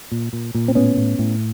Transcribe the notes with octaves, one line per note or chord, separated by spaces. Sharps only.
A#2
A#2
A#2
C4
A2 B3 C#4
A2
A2